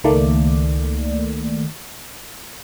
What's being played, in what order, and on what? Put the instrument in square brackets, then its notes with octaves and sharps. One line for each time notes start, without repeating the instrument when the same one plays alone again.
[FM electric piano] C#2 D#3 A3 A#3 D5